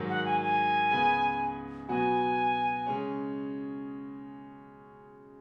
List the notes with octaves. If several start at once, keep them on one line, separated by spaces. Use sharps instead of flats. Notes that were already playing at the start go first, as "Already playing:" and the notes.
Already playing: G#2 D#3 F#3
F#5
G#5
G#5
C#2 C#3 B3 G#4 B4
B2 F#3 B3 F#4 G#5
C#3 G#3 C#4